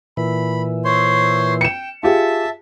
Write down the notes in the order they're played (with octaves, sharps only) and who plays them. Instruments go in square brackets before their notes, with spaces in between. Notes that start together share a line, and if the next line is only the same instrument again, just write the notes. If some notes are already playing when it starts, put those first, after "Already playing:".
[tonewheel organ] A#2 E3 [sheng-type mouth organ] B5
[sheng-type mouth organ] C5 C#5 C6
[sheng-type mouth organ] G5 [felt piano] C#7 E7
[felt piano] F4 G4 G#4 [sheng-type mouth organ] E5 A5